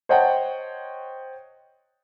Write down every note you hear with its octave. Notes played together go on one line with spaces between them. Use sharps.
C5 C#5 D#5 F#5 G5 A5